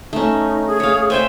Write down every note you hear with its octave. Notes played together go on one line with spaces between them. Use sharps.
A3 C#4 D#4
G#4
C#5 F5
C5 E5 G5 G#5